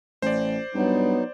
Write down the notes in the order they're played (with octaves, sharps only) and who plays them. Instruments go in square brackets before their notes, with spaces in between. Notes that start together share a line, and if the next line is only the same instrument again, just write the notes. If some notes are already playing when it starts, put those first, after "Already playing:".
[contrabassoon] A1 [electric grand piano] C5 D5
[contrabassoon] G2 [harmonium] F#3 D#4 [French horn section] B3